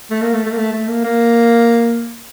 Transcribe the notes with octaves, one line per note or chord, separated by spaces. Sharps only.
A3
A#3
A3
A3
A#3
A3
A3
A#3
A#3